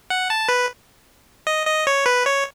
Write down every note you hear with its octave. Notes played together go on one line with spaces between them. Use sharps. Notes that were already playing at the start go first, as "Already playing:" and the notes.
F#5
A5
B4
D#5
D#5
C#5
B4
C#5